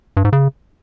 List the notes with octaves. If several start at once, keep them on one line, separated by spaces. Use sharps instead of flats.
G2
G#2
C#3